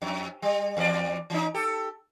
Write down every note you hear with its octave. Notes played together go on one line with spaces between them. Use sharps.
F2
G3
E2 A#4 D5
E3 C#4 D#4
G4 A4